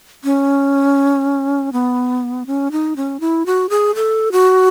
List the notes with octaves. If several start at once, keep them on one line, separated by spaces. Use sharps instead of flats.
C#4
B3
C#4
D#4
C#4
E4
F#4
G#4
A4
F#4